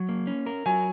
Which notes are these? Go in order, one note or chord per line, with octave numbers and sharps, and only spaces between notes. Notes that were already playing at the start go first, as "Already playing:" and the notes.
Already playing: F#3
A#3
C#4
A#4
F#3 G#5